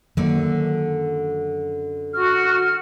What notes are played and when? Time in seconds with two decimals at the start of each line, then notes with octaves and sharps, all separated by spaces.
0.17 F#2 D3 D#3 F#3 A#3
2.14 F#4 F6